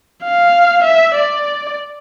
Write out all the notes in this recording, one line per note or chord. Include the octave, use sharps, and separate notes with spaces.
F5
E5
D5